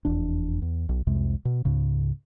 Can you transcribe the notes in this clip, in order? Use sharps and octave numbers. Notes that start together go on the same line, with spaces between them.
F1 E2 D4
E2
B1
C2 F2 C3 G#3
B2
C#2 G#2 C#3